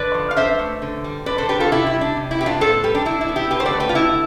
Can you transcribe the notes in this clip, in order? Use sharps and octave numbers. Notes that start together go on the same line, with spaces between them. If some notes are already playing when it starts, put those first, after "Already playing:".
Already playing: D3 B4 D5
F3
F5
D4 C5 E5
A3
D3
G3
D3 B4 D5
A4 C5
D4 G4 B4
F4 A4
C3 E4 G4
E4
G3
D4
C3
E4
B3 G4
D4 F4
A2 A4 C5
G3 G4 B4
D4
D4 E4
E4
B3
E4 G4
D3 G4 B4
C5
B4 D5
A3
G4 B4
F4
D3 E4